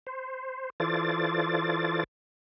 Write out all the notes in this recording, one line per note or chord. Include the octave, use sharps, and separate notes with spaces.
C5
E3 F4 A4 C5 D5 A6